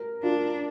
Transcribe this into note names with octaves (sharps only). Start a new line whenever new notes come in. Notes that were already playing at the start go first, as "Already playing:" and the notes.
Already playing: A#4
D4 F4